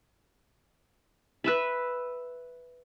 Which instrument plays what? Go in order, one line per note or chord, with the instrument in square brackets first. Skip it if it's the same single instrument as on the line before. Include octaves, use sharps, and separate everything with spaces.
[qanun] B4 E5 B5